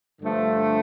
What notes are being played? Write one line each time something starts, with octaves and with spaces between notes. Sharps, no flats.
G2 D3 F3 A3